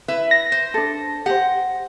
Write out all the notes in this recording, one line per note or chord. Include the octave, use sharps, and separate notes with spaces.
E4 B4 E5
A#6
C5
D4 A4
G4 C5 F#5